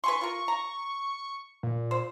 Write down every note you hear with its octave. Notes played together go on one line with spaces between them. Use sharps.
B4 G#5 C6 C#6
F4 A#4
A#5
A#2
C5